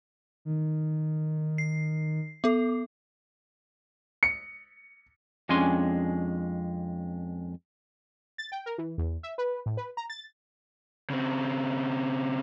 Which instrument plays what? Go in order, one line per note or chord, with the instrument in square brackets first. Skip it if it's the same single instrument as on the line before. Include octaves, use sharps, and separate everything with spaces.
[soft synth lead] D#3
[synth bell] C7
B3 A4
[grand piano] C#7
[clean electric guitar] F2 G#3 C#4 D4 G#5 C6
[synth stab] A6
G5
A#4
E3
E2
E5
B4
A2
B4
A#5
A6
[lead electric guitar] C#3 C4